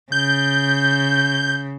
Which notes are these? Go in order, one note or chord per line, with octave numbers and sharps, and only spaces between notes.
C#3 G6